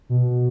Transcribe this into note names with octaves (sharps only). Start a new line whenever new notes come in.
B2